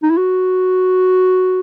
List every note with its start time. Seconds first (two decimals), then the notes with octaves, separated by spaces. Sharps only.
0.03 D#4
0.10 E4
0.17 F#4